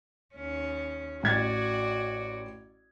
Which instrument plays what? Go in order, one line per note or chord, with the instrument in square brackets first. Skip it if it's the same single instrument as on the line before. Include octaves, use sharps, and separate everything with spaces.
[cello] D#2 C#4
[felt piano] A1 G#6 A6 [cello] F#4 D5